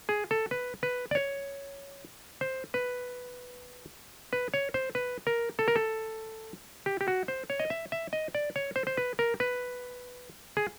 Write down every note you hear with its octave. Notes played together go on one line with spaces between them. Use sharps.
G#4
A4
B4
B4
D5
C#5
C5
B4
B4
C#5
C5
B4
A#4
A4
A#4
A4
G4
G4
F#4
C5
C#5
D#5
E5
E5
D#5
D5
C#5
C5
C5
B4
A#4
B4
G#4